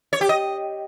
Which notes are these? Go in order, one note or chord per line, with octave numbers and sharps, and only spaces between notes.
C#5
G4
D#5